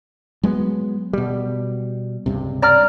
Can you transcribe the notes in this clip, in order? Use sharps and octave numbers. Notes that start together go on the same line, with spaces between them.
F#3 G#3 B3
B2 G3
C#2 G2 C3
D5 A#5 F6